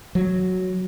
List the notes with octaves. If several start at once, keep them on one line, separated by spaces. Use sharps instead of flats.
F#3